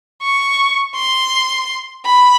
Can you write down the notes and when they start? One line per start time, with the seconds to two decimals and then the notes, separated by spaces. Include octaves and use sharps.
0.23 C#6
0.95 C6
2.06 B5